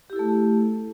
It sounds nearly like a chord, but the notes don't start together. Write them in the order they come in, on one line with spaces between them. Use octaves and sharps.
G4 E4 A4 A3